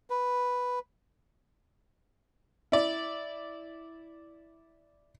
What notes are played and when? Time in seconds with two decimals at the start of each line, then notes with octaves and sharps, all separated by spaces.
0.10 B4
2.72 E4 D5